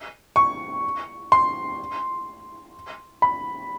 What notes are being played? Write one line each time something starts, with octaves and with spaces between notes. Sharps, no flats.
C#6
C6
B5